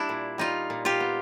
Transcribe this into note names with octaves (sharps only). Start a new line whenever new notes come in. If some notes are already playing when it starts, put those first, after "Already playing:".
Already playing: G3 D4 E4
A#2
G3 D#4 F4
A#2
F4 G4
B3